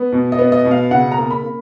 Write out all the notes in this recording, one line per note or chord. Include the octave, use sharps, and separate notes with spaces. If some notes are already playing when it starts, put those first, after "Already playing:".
Already playing: B3
B2
D#5
B3
D#5
B2
F5
C#3 F#5
A#5
A#3
B5
A#3